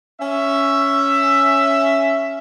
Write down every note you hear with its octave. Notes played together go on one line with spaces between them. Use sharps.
C#4 E5